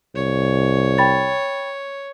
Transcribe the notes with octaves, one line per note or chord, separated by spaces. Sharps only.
C2 C#5
G5 B5 A6